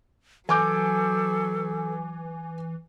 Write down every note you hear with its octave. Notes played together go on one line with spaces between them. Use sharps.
E3 F#3 A4 G#5 D6 G6